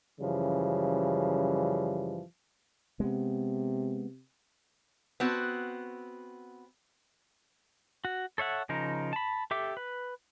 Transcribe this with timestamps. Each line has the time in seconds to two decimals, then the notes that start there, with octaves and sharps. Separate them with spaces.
0.20 F#2 C#3 E3 F3 G3
3.00 C3 G#3 B3
5.20 B3 C4 F#4
8.05 F#4
8.38 A4 C#5 E5 F#5
8.69 C#3 F3 D#4 A#4
9.13 A5 B5
9.51 G4 A4 E5 D6
9.77 B4